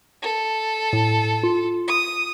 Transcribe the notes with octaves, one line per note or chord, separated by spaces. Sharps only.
A4
A2
F4
D#6